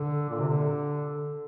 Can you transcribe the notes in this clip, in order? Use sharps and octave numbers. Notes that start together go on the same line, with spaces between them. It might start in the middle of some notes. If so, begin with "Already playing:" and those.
Already playing: D3
A#2
C3
D3